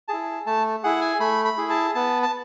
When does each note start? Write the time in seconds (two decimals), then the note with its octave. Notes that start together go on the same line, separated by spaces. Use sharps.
0.08 E4 G#4 A5
0.46 A3 A5
0.84 E4 G#4 F#5
1.01 G#5
1.20 A3 B5
1.45 B5
1.58 E4 G#4
1.70 A5
1.95 B3 A5
2.23 A5